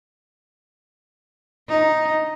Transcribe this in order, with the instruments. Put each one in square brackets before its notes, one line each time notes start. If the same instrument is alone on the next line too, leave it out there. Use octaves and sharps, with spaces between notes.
[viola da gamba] D#4